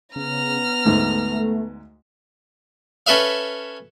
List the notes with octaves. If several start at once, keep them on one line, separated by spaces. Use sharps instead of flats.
C#3 B3 A#5 F6
D2 G#2 A3
C#4 A4 B4 E5 F5